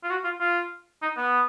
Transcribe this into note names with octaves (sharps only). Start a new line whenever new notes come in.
F4
F#4
F4
F4
D#4
B3